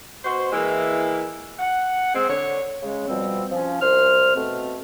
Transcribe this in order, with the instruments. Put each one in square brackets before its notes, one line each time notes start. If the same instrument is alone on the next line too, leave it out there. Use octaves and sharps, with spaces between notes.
[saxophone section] B2 F#4 C5
E3 G#3 A#3 E4 A#4
F#5
G#3 C4
D3 C#5
[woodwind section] C#3 G#3
B2 F3 G3 C4
F3 C#4
C2 C5 F6
B2 A3 C4